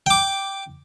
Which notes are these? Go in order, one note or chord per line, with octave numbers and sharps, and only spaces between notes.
G5 D6